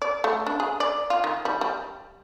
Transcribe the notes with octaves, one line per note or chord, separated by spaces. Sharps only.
D5
A3
D4
G#4
D5
F4
D#3
G3
G3